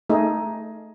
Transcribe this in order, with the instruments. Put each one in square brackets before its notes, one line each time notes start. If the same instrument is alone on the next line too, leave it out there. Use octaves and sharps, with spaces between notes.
[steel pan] A3 D#4 G#4